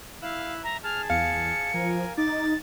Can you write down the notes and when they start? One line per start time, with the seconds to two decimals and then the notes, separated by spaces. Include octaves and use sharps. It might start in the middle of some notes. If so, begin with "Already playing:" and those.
0.22 E4 F5 E6 F#6
0.64 E5 A#5
0.84 G#4 A5 F6
1.10 E2 F5 C#7
1.74 F3 A#4 G#5
2.18 D#4 D6 A6